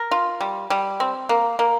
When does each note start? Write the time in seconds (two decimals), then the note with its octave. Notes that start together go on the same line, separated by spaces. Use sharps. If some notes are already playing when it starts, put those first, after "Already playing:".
Already playing: A#4
0.11 F4
0.41 G3
0.70 G3
1.00 C4
1.29 A#3
1.59 A#3